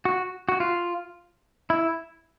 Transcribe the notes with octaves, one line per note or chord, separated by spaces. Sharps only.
F#4
F#4
F4
E4